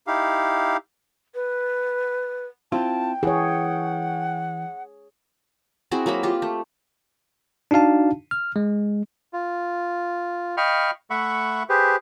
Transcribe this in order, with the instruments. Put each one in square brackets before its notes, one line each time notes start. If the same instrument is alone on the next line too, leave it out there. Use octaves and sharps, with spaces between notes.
[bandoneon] D#4 E4 G4 F5
[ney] B4
[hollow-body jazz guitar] C4 E4 F4 [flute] G5 [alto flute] A5
[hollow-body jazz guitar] E3 [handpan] G#4 C#5 [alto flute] F#5
[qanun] C4 E4 F#4 G#4
F#3 A#3 C4 B5
F4 G4
A3
[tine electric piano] D4 D#4 F#4 F5 A5
F6
G#3
[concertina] F4
D#5 F5 G5 B5 C#6 F6
A3 E5 F#5 B5 C#6
G4 G#4 B4 C5